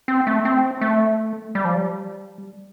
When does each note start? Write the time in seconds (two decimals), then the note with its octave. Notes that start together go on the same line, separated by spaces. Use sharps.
0.08 C4
0.27 A3
0.45 C4
0.81 A3
1.55 G3
1.65 F3
1.75 G3